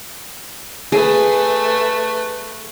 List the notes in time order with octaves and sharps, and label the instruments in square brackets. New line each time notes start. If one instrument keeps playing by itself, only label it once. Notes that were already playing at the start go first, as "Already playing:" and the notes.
[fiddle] A3 B4 [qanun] G#4